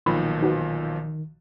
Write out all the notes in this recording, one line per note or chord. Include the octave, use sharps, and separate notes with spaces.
B1 A#2 D#3 F3 B5
D#4 F#4 B4